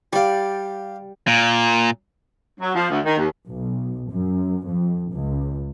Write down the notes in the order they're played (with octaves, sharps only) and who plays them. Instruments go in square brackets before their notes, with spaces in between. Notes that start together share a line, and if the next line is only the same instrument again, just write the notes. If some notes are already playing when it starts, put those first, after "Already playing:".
[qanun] G3 D5 [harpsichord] G4 F5
[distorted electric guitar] A#2
[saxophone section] F#3
F3
D2
D#3
D#2
[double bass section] B1
F#2
F2
C#2